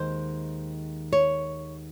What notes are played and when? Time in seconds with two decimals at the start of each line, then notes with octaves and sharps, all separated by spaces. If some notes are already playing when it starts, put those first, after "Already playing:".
Already playing: D#2 D#3 G#3 C5
1.13 C#5